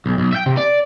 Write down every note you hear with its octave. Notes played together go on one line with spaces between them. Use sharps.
B1
B1
E5 G5
C3
D5